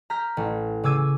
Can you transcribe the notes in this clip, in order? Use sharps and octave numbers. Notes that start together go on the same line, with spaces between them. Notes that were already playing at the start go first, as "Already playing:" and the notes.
A#5 F6 G6 B6
A1
C#3 D6 E6 G#6 D#7